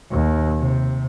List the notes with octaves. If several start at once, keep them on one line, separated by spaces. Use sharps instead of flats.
D#2
C3